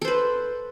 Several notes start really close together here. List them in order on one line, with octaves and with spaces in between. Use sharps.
A4 C5 B4